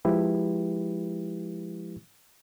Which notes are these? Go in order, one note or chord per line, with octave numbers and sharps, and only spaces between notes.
F3 G#3 E4 G4 B4